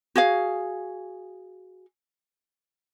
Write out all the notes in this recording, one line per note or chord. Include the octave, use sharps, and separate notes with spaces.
F#4 G#4 F5